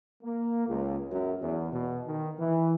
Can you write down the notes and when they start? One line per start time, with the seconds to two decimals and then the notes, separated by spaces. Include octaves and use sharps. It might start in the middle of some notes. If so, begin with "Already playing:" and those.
0.24 A#3
0.68 C#2
1.11 F#2
1.42 E2
1.71 B2
2.06 D#3
2.38 E3